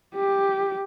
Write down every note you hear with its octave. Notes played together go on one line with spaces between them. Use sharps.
G4